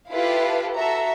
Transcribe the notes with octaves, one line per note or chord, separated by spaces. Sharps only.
E4 F4 G4 A4 B4 F5
F#4 A4 E5 A#5